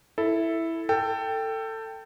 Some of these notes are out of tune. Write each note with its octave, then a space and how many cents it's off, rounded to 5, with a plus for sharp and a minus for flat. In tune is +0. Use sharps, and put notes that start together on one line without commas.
E4 +0 A4 +0
A4 +20 G5 +0